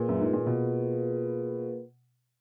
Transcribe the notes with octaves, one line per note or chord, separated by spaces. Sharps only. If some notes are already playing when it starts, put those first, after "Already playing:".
Already playing: A#2 A#3 F4 G#4 B4
F#2
G#2
A#2
B2